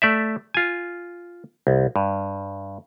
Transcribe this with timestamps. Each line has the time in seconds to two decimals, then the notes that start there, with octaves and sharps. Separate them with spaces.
0.02 A3 D5 E5
0.54 F4 G#5
1.67 C2
1.96 G2